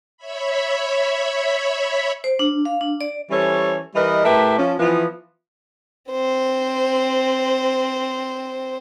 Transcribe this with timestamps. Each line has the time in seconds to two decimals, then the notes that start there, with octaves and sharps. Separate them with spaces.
0.17 C#5 E5 B5
2.24 C5
2.39 D4
2.65 F5
2.81 D4
3.01 D5
3.30 E3 G3 C#4 A4 C5 C#5
3.95 E3 G3 A#4 B4 D#5
4.25 A2 A3 G4 A#4 B4 E5
4.58 F3 C#4
4.79 E3 F3 B3
6.11 C4 C5